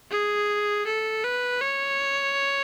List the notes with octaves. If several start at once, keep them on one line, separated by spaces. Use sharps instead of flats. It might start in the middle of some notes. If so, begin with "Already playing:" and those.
G#4
A4
B4
C#5